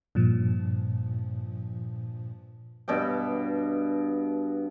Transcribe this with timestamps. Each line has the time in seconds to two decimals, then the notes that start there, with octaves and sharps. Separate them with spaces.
0.15 G2 A#2 F3
2.88 G2 B2 D5 G5